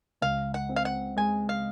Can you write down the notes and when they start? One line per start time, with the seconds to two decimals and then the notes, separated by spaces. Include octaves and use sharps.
0.22 C#2 F5
0.54 F#5
0.69 C4
0.76 F5
0.85 F#5
1.17 G#3 G#5
1.49 F5